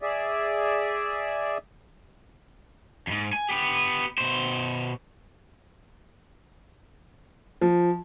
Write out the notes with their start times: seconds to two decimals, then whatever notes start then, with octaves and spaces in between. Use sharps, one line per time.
0.02 G#4 D5 E5
3.07 F2 G#2
3.33 G#5
3.49 B3 G4
4.18 B2 C5
7.61 F3